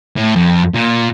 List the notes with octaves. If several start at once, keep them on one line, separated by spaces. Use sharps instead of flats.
A2
F2
A#2